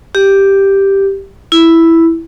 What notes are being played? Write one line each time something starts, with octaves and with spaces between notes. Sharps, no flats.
G4
E4